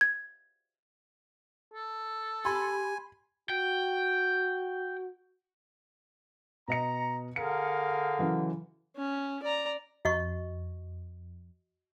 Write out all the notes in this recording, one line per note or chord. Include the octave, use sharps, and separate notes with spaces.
G#6
A4
G4 G#5 B5 C6
F#4 G5
B2 D#5 A#5 C#7
D3 G#4 A#4 F5 C#7
C#3 E3 F#3
C#4
D5 A#5
F2 F#4 D#5 C#6